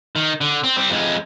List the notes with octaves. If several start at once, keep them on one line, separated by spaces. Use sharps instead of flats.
D#3
D3
C4
G3 C4
F2 G#3